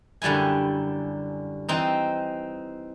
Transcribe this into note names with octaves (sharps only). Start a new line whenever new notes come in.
F#2 D3 G3 E4 G#5
E3 C4 D#4